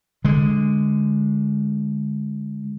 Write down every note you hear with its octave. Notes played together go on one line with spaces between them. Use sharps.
D3 G#3